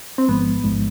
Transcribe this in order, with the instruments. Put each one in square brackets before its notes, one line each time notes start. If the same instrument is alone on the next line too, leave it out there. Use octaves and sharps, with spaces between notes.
[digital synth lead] C4
[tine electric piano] A1 G#2 F3 G#3 [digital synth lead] B3
[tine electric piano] A1 G#2 F3 G#3